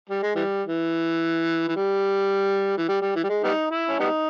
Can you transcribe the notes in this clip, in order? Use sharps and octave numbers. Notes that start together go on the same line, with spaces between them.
G3
G#3
E3 G3
E3
E3
G3
E3
G3
G3
E3
G3
G#3
G3 B3 D#4
E4
C#4
G3 B3 D#4